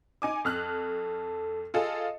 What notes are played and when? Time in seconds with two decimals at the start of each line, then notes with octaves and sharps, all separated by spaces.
0.22 D#4 G#5 D6
0.45 F2 A4 F6 F#6
1.74 F4 G#4 A4 D#5